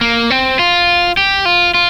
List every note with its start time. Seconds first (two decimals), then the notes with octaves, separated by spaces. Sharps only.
0.01 A#3
0.30 C4
0.59 F4
1.17 G4
1.45 F4
1.74 F4